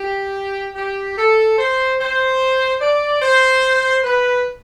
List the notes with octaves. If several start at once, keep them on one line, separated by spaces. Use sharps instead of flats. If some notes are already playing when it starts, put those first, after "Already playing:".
Already playing: G4
G4
A4
C5
C5
D5
C5
B4